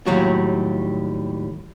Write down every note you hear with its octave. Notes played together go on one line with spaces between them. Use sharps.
D#2 A2 F#3 G3 F#4